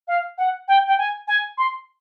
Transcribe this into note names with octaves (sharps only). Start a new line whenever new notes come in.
F5
F#5
G5
G5
G#5
G#5
C6